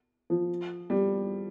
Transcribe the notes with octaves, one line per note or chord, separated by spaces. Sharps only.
F3
G3